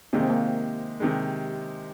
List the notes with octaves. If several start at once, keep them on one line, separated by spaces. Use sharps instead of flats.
C3 D#3 G#3 A#3
C4
A#3
C3 D#3 G#3